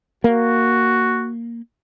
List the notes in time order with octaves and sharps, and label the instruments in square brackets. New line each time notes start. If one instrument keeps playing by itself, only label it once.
[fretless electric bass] A#3 [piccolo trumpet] F#4